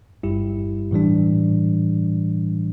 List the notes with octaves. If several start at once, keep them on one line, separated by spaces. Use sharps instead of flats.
G1 G2 G3 E4 G4
A2 E3 G3 D4